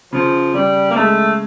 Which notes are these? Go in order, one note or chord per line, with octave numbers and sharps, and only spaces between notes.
C#3 F3
C#3 G3
A#3
G#3 A3